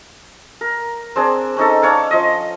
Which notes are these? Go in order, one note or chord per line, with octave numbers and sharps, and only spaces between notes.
A#4
C4 D4 G#4
C#4 D#4 A4
C#4 D4 C#5 F5
F3 D#5